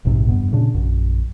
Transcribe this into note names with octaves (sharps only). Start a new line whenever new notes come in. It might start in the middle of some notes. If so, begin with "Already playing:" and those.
F1 A#1 G#2 C3
F1 G2 B3
A#2 C#3 D4
A#1 F#2